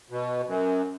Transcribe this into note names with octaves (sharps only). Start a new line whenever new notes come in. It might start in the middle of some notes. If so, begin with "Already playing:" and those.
B2
F#2